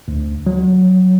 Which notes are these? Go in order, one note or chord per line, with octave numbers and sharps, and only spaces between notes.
D2
F#3